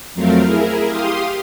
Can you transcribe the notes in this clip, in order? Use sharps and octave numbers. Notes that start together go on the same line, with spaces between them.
F2 F#3 A3 C4 A#4 F5
E4 G#4 A#4
G4 F5 C6 D#6